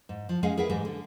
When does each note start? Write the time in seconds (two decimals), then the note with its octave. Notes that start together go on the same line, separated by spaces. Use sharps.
0.09 G#2
0.29 F3
0.43 G#3 C#4 G#4 D#5 F5 F#5
0.57 G#4 A#4 B4 E5 F#5
0.69 G#2 E3 G3 G#3
0.85 D3